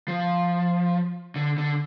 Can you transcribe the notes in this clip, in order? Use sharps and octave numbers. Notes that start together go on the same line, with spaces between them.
F3
D3
D3